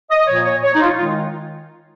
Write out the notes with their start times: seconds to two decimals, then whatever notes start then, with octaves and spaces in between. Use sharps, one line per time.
0.10 D#5
0.27 A#2 F3 A#3 C#5
0.45 C#5
0.63 C#5
0.74 D#4
0.81 F4
0.97 D#3 G#3 F4